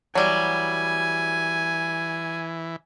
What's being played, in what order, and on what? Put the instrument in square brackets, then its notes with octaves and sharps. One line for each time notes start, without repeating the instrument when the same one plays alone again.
[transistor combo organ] E3 [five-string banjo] F#3 G3 [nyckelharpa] G#5